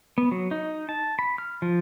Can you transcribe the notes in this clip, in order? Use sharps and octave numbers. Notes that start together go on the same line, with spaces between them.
B3
F#3
D#4
A5
B5
F6
F3